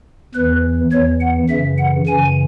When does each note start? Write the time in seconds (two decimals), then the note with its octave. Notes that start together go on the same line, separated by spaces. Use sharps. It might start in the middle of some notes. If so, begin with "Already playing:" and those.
0.34 E2 E3 B4
0.92 E2 E3 C#5
1.21 F#5
1.49 F#2 C#3 E3 E5
1.78 F#5
2.07 F#2 C#3 E3 G#5